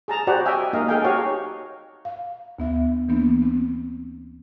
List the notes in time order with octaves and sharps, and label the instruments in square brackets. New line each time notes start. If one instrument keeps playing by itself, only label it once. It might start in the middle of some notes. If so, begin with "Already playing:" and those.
[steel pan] G#4 A5 A#5
F#4 G4 C5 D5 F#5
D#5 E5 G5 G#5
A#3 D#4 D#5 F5
D#4 G#4 A4 F5 G5 G#5
F#4 G4 C#5 F5
[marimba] F5
D2 B3 E5
E3 A#3 B3 D4
C4